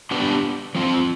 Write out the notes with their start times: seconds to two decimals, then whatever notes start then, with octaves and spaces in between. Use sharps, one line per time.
0.11 B3 D4 G4 B4
0.75 F3 C4 F4